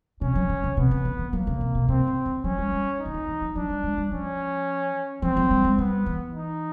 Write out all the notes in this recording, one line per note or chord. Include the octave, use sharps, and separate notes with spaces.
C3 C#4
F#3
D3
C#3
C3 B3
C#3
D3
D#3
F#3 A#3
C#3
C3
B2
C3 C4
C#3
D3
F#3 C#4
G3
G3
D#4
D3
D#3
E3
F3
F#3 D4
G3
G#3
G3
F3 C#4
F3 C4
F#3
G3
G#3
G3 B3
E3
D#4